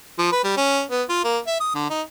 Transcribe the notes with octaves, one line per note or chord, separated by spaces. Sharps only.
F3
B4
G3
C#4
B3
F4
A#3
E5
D#6
D3
D#4